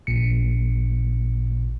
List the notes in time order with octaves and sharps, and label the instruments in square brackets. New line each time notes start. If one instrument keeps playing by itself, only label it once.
[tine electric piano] A1 A#2 C#7